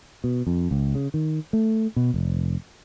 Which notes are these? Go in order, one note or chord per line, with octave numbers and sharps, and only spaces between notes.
B2
F2
C#2
C#3
D#3
A3
B2
F1